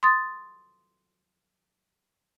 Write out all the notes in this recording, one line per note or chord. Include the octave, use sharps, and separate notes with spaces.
C6 D#6 A6